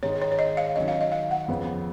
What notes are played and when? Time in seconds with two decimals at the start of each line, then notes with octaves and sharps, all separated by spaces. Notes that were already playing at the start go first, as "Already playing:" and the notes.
0.03 G#2 D#3 G#3 D#4 C#5
0.22 C#5
0.32 C#5
0.39 D#5
0.57 F5
0.76 D#3 F#3 C#4 D#5
0.88 F5
1.01 D#5
1.12 F5
1.31 F#5
1.48 F2 C#3 F3 B3